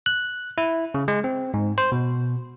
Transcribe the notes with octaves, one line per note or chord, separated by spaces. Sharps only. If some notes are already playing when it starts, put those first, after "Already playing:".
F#6
E4
C#3
G#3
C4
G#2
C5
B2